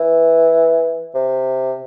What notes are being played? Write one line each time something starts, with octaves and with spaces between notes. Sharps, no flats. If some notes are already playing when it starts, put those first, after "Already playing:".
Already playing: E3
C3